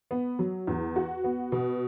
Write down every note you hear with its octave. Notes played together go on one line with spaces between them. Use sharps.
B3
F#3
E2
F#4
B3
B2